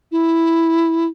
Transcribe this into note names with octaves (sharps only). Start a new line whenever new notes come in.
E4